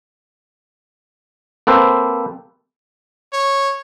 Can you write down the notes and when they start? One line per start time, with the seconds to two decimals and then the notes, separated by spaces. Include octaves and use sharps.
1.67 A#3 C4 A4 B4 C5
3.33 C#5